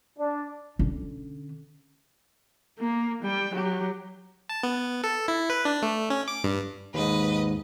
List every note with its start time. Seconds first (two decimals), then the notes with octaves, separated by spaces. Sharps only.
0.18 D4
0.79 D3 C#4
2.79 A#3
3.23 G3 G5
3.54 F#3 G4
4.49 A5
4.63 B3
5.04 A4
5.28 E4
5.50 B4
5.65 D4
5.82 A3
6.10 C#4
6.28 D6
6.44 G2
6.94 D#2 G#2 B4 D#5